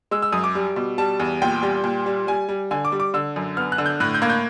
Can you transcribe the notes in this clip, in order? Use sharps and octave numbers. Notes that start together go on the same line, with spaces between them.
G#3 E6
E6
F#2 D#6
D6
G3
B2
G3 A5
E2
A#2 G5
G3
A#2
G3
G3 G#5
G3
D3 G#5
D6
G3
D6
D3 E6
F#2
B3 F6
F#6
D3
G6
A2 F#6
G6
A#3 G#6
G6